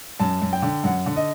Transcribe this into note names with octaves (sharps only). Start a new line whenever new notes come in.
F#2 A5
F#2
G5
D3
F#2 F#5
D3
D#5